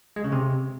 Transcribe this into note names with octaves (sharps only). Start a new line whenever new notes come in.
G#3
C#3
C3